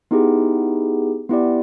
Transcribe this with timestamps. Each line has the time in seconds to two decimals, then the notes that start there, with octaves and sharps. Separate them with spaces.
0.11 B3 D#4 E4 G4 G#4
1.29 B3 E4 G4 D5